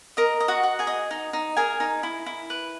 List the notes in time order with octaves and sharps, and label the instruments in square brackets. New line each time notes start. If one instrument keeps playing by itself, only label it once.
[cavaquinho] A#4 D#5 A#5
D#5
F#4 F#5
F#4
G#4 G#5
D#5
D#4
D#4
G#4 A#4 G#5
D#4
E4
E4
B4